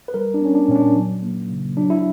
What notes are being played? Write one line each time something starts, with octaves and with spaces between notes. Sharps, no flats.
B4
G3 A#4
D4
B3 C#4
D4
A#2 C#4
D4
F#3
A#3
C#3
F#3 D4
E4